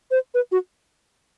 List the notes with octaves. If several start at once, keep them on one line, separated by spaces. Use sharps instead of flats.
C5
B4
F#4